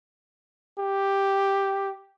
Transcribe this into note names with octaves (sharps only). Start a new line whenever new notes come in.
G4